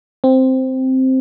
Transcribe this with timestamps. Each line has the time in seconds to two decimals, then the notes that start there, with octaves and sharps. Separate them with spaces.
0.24 C4